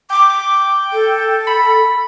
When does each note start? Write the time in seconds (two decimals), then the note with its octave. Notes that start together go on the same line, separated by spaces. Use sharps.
0.10 G5 D6
0.93 A4
1.47 B5